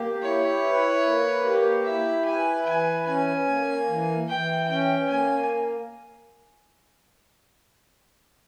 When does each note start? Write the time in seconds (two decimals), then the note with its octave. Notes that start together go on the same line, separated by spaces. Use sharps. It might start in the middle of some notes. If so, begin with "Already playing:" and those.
Already playing: A#3 G4
0.22 E4 C#5
0.63 B4
1.03 A#3
1.44 G4
1.84 E4 E5
2.25 B4 G#5
2.65 E3 G#5
3.06 C#4 G#5
3.47 A#3
3.88 E3
4.28 E3 G5
4.68 C#4 G5
5.09 A#3 G#5